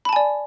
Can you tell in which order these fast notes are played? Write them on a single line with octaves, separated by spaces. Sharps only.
B5 A5 G#5 D5